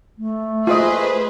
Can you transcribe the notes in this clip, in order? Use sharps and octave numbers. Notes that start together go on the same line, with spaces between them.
A3
F4 G#4 B4 C5 D#5